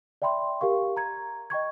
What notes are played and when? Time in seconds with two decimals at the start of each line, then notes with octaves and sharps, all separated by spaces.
0.22 D5 E5 G5 B5 C6
0.61 G4 A#4 F5 C#6
0.97 A#5 G#6
1.50 D#5 G5 C#6 G#6